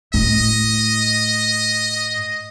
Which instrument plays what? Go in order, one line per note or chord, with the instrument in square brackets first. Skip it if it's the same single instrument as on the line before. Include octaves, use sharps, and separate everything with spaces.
[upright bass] A2 [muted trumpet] D#5